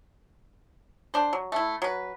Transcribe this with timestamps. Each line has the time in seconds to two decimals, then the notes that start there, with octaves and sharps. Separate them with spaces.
1.14 D4 C5
1.33 F#3
1.52 A3 E4
1.82 F#3 B4